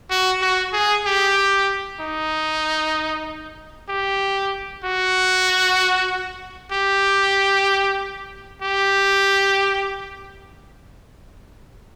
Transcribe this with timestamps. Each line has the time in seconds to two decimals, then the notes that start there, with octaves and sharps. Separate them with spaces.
0.10 F#4
0.42 F#4
0.73 G#4
1.05 G4
2.00 D#4
3.88 G4
4.83 F#4
6.72 G4
8.62 G4